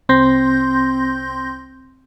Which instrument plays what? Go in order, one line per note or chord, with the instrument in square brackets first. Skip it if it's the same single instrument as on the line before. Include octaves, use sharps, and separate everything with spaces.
[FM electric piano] C2 C4 C6 G6 A#6